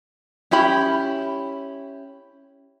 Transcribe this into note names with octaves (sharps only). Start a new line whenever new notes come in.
C#4 E4 G4 B5